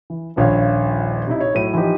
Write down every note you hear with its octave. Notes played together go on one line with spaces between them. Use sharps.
E3
D#1 A#1 C#5 F5
C3 D#4 E4
C#5
A2 F#3 D#7
E3 F3 D#4 G4